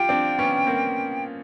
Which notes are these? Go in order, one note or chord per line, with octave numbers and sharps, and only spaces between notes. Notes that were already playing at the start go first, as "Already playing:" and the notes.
Already playing: F4 G4 G5
C4 D4
B3 C#4
A#3 C4